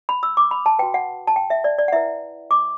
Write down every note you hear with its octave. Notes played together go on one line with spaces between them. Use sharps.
B5
E6
D6
B5
A5
F#4 B4 G5
F#5
A5
G5
E5
D5
D5
F#5
E4 B4 E5
D6